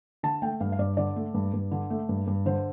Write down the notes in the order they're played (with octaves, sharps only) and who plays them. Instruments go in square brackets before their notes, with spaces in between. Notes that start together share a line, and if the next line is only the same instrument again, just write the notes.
[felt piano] D3 A5
A3 G5
G2 F5
F5
G2 D5
D3 D5
A3
G2
G2
D3
A3
G2
G2
D3 C5